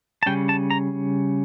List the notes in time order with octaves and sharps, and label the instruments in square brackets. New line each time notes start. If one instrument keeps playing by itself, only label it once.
[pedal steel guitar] A5
C#3 G3 C#4 G5
A5
A#5